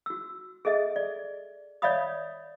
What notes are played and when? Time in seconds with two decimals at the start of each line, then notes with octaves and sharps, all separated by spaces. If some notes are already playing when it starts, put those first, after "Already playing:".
0.06 F#4 E6
0.65 G#4 A4 D#5 E5
0.96 D5
1.82 C#5 D5 E5 F5 B5 D#6